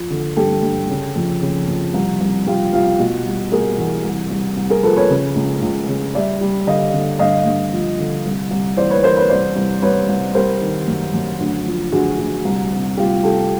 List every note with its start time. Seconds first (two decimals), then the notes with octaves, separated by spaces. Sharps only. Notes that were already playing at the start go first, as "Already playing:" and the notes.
Already playing: F3
0.10 D3
0.37 G2 G4 A4
0.63 G2
0.89 C#3
1.16 F2
1.41 C#3
1.68 F2
1.94 C2
2.21 C2
2.47 C2 F4 G4
2.73 C2 F4
2.99 B2 F#4
3.26 G3
3.52 B2 G#4 A#4
3.78 E2
4.04 C2
4.31 C2
4.57 C2
4.70 G#4 A#4
4.83 F3 A4 B4
4.97 B4 C#5
5.10 C#3
5.35 C#2
5.62 C#2
5.88 C#3
6.15 G3 D5 E5
6.41 G3
6.67 D3 D#5 F5
6.93 D3
7.19 G2 D#5 F5
7.46 G2
7.72 F3
7.99 D3
8.25 C2
8.51 C2
8.77 E3 C5 D5
8.90 B4 C#5
9.03 E3 A#4 C5
9.17 B4 C#5
9.30 C2 C5 D5
9.56 C2
9.82 C2 B4 C#5
10.09 C2
10.35 G3 A#4 C5
10.61 D#3
10.87 F#2
11.14 F#2
11.40 D2
11.66 F3
11.92 D2 F#4 G#4
12.18 D2
12.45 C2
12.71 C3
12.97 C2 F4 G4
13.24 C3 G4 A4